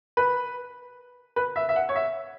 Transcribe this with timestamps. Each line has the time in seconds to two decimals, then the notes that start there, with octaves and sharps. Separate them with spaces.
0.17 B4
1.36 B4
1.56 E5
1.69 E5
1.76 F#5
1.89 C#5
1.95 E5